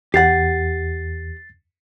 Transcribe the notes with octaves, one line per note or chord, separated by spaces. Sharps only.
E2 G4 F#5 A6 C7